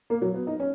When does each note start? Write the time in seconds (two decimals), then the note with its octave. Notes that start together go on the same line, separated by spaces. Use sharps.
0.10 A#3
0.22 F#3
0.34 B3
0.47 D#4
0.60 C#4